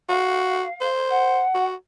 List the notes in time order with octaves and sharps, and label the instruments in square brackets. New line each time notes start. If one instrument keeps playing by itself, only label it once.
[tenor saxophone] F#4 [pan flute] F5
[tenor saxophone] C5
[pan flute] F#5
[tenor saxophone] F#4